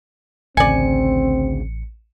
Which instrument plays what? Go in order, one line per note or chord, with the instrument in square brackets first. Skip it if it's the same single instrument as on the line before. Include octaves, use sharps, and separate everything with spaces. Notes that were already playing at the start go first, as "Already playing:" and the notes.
[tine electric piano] A1 C#7 [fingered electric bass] D2 C#3 [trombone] C4 [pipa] D5 G#5